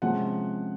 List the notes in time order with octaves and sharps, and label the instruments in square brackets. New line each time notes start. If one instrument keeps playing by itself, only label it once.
[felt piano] C3 F3 G#3 C#4 F#5